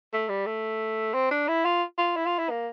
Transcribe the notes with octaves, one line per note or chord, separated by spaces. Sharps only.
A3
G3
A3
C4
D4
E4
F4
F4
E4
F4
E4
A#3